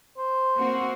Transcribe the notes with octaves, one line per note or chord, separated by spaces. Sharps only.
C5
A#3 C4 F#4